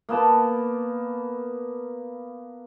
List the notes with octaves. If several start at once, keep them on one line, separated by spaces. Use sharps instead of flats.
A#3 B3 A5